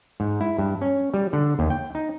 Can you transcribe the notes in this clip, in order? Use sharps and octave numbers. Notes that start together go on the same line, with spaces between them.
G#2
E4
G2
C#4
G3
D3
D#2
G5
D#4